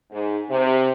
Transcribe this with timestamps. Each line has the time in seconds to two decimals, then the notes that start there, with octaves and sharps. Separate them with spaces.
0.11 G#2
0.50 C3